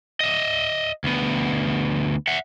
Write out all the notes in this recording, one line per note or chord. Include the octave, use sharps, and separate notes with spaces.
D#5 E5
D2 B3
E5 F#5